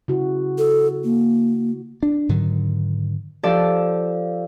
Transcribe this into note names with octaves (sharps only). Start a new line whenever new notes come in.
C#3 E4 F#4
A4
A#3
D4
G#2 D3 D#3 F#3
F3 G4 A4 D5